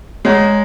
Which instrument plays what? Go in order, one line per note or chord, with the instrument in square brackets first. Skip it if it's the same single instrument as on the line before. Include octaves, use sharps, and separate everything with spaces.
[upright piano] G#3 [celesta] G#4 C#5 F#5 A#5 C#6